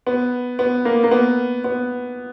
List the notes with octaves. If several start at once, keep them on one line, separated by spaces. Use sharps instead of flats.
B3
B3
A#3
A#3
B3
B3